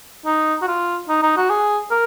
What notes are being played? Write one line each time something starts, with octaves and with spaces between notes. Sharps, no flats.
D#4
F#4
F4
D#4
D#4
F#4
G#4
A#4